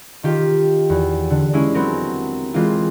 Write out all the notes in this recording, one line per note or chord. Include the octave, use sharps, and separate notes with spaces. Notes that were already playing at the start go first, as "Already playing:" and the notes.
D#3 F4 G4
E2
D3
G#3 C#4 E4
F#3 B3 C4 A#4
E3 G#3 C4 F4